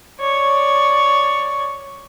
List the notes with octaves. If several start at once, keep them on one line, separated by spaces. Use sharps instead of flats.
C#5 D5